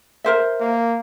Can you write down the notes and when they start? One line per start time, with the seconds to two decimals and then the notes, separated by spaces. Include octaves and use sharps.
0.24 A#4 C5 E5
0.60 A#3